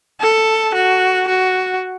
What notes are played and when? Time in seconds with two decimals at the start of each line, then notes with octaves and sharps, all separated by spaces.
0.21 A4
0.75 F#4
1.28 F#4